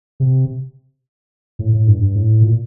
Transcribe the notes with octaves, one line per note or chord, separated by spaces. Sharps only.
C3
A2
A2
G2
G2
A2
A#2